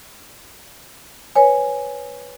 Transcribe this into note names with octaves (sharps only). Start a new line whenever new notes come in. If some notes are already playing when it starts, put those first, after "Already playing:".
B4 C#5 G#5